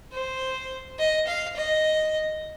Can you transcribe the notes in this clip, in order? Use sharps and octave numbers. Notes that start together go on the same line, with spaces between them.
C5
D#5
F5
D#5